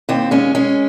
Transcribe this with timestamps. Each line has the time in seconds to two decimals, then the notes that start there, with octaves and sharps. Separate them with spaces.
0.09 D#2 C4
0.31 G#3 C#4
0.55 G#3 C#4